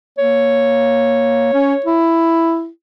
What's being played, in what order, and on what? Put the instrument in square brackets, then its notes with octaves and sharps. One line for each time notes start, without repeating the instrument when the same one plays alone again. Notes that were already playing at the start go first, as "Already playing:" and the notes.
[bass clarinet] A#3 [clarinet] C#5
[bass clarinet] C#4
E4